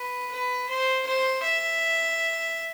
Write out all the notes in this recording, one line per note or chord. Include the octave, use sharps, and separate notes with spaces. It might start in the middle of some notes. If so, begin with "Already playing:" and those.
Already playing: B4
B4
C5
C5
E5